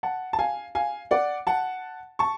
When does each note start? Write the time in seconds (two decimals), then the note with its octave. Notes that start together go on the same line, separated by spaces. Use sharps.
0.03 F#5 A5
0.33 A5
0.39 F5 G#5
0.75 F5 G#5
1.11 D5 F#5
1.47 F#5 A5
2.19 A5 C#6